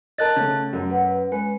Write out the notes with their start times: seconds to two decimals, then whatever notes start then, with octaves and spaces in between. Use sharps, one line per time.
0.18 A#4 D#5 A5 F#6 A6
0.36 C#3 A3 C#4
0.73 F#2
0.90 B4 F#5
1.32 G#3 B4